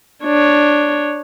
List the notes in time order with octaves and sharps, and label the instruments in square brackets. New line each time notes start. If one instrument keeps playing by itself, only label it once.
[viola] D4 C#5